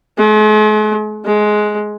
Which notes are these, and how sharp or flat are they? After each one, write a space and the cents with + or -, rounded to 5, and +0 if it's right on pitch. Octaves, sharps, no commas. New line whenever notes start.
G#3 +45
G#3 +15